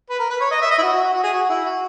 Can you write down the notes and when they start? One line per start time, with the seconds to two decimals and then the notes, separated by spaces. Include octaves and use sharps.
0.10 B4
0.19 A#4
0.30 B4
0.40 C#5
0.51 D#5
0.61 E5
0.71 D#5
0.78 E4
0.82 F#4
0.92 F#4
1.03 F#4
1.13 F#4
1.24 G#4
1.34 F#4
1.49 E4
1.65 F#4